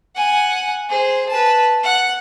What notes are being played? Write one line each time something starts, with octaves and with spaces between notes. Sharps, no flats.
F#5 G#5
G#4 C5
B4 A5
F#5